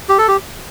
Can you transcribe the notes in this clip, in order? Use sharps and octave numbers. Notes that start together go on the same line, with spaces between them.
G4
A4
G4